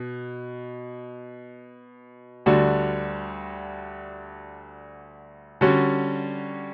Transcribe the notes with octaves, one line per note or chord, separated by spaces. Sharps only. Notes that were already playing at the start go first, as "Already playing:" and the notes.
Already playing: B2
D2 D3 G3 D4 F#4
D3 G3 C#4 F#4